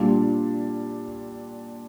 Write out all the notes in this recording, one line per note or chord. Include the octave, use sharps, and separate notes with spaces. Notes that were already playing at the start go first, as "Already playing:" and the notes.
Already playing: A#2 G3 D4 F4